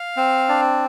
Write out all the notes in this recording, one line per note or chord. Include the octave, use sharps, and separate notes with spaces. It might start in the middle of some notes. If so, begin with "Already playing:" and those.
Already playing: F5
C4
D4